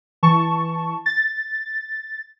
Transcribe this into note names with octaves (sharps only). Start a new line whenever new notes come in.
E3 A5 C#6
A6